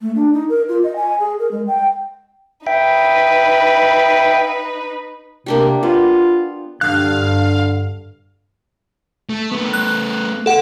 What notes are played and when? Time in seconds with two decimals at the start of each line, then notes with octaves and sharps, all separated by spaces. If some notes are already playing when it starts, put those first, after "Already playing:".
0.01 A3
0.15 D4
0.34 D#4
0.49 A#4
0.69 F4
0.84 D#5
0.96 G#5
1.20 G#4
1.39 A#4
1.52 G#3
1.67 G5
2.67 D#4 B4 E5 G5
5.46 C3 A#3 D4 G4
5.83 B3 F4
6.81 G2 D3 F5 F#6
9.29 A3
9.52 A3 B3
9.73 F#6
10.46 A4 F#5